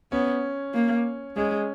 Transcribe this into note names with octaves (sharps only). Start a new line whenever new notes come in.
B3 C#4
A#3
G#3 C#4